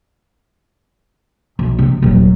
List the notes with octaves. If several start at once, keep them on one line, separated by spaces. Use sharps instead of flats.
B1
C3
D#1 F#3